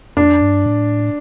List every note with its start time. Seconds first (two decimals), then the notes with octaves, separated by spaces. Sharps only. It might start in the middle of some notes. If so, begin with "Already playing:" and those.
0.17 F2 D4
0.41 G2
0.66 A2